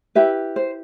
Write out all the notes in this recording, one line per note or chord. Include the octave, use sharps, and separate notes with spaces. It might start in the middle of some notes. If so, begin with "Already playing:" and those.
E4 G4 B4 E5
C5